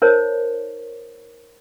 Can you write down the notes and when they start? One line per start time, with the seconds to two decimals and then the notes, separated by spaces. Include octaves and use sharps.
0.02 D#4 A#4 C5 C#5